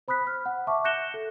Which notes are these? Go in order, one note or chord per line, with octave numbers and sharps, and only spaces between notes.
C5 B5 D#6 F#6 B6
F6
F#5
E5 A5 C#6 D6
F#6 G6 A#6 C#7 E7 G7
A4